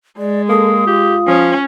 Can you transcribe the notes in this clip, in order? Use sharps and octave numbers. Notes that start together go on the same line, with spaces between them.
G#3 D5
A#3 A4 D#6
F4 G4
F3 C#4